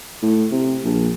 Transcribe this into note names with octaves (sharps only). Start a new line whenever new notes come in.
A2
C3
A#1